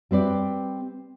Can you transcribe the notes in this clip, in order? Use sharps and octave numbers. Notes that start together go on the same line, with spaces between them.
G3 C4 B4 D5